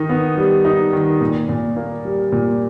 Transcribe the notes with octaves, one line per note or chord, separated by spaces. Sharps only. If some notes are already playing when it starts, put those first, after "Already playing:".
Already playing: D#3 D#4
B3
G3
D#4
D#3
A#2
A#2
A#3
G3
A#2